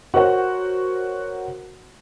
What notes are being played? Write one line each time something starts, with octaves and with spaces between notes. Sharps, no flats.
F#4 A#4 C5 C#5 F#5